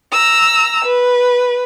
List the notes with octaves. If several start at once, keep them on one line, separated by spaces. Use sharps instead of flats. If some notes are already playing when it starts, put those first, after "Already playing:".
A#5 E6
B4